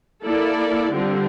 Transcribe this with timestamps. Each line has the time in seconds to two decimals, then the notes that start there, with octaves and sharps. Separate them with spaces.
0.23 A#3 E4 A4 D5
0.92 D3 G3 C4 F4